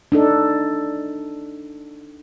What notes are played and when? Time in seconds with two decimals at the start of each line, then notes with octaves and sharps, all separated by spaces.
0.12 D4 D#4 A4